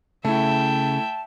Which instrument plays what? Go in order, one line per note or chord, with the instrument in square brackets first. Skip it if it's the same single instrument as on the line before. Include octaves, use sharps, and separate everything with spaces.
[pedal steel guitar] C#3 [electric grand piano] A3 E4 [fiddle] E5 G5 [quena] A5